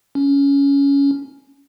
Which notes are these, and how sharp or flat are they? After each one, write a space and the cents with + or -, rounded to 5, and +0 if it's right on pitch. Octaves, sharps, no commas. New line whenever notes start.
C#4 +15